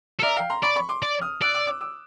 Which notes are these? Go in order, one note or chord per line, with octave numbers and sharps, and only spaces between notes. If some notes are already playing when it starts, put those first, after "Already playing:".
A4
A#4 D5 E5
F5 G5
A#5 C6
D5 B5 C#6
B5 C#6
C6 D6
D5
D#6 F6
D5 E6 F#6
D6 E6
D6 E6
D6 E6